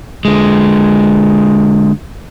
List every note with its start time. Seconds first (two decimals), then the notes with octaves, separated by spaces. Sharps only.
0.25 D3 G#3